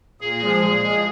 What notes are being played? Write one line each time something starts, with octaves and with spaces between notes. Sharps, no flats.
A#2 G#4
F3 G#3
A#2
F3 G#3